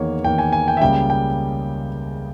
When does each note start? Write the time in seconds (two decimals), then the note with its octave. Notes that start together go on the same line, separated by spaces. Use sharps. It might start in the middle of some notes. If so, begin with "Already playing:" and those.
Already playing: E2 D#3 A#3 C#5
0.24 E2 D#3 A#3 G5
0.38 G#5
0.53 G#5
0.68 G5
0.77 E5
0.81 C#2 C#3 G3 A#3 G5
1.10 G5